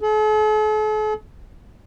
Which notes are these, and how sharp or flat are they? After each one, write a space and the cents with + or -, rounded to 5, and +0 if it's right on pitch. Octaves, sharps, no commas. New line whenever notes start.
A4 -45